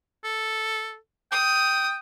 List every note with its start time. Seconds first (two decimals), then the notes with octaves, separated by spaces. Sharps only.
0.24 A4
1.32 G5 D#6